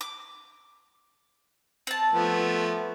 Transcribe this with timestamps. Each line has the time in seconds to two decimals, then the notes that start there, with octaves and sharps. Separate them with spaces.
0.01 D6
1.87 C4 A5
2.13 F3 A3 B3